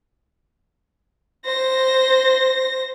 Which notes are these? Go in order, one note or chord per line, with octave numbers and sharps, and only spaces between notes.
C5 A#6